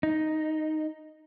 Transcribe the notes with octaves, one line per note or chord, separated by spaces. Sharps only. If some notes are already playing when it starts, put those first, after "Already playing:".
D#4